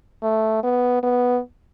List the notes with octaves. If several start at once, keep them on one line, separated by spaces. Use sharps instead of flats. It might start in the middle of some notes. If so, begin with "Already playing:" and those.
A3
B3
B3